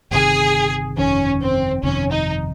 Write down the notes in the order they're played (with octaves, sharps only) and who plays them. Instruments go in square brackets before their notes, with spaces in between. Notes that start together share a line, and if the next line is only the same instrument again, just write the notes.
[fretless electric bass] G1 F2 C3 D#3 [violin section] G#4
[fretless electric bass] G1 F2 C3 D#3 [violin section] C#4
[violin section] C4
[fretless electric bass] G1 F2 C3 D#3 [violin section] C#4
[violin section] D#4